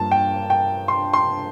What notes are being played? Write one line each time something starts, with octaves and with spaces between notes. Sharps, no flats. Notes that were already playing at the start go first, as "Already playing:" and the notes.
Already playing: G2 F3 A#3 A5
G5
G5
C6
C6